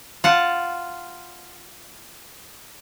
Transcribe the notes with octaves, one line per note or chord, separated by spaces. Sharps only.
F4 F#5 A5